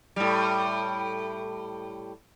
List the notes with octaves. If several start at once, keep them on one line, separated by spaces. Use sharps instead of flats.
A2 G3